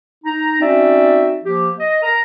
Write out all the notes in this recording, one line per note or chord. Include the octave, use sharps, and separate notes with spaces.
D#4 A#5
C4 C#4 D#4 F#4 D5 E5
F3 A#3 G4
D#5
A#4 A#5